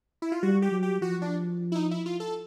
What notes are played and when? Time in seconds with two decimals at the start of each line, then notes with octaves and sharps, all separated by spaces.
0.22 E4
0.32 F4
0.43 G3 F#4
0.62 G4
0.72 F#3
0.83 G4
1.02 F3 F#4
1.22 D4
1.72 E4
1.75 D#4
1.91 E4
2.06 F4
2.20 A4